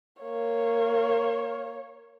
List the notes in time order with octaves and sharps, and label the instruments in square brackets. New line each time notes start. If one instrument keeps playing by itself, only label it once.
[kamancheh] A#3 C#5